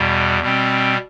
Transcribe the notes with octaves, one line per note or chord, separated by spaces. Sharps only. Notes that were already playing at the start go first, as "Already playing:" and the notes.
Already playing: E2 B2 G3
B2 G3 C4